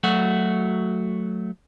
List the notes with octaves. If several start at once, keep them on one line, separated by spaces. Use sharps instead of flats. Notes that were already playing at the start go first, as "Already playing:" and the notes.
F#3 A3 F#4